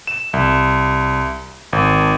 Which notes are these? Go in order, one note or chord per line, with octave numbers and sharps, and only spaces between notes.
E7
C2
G#1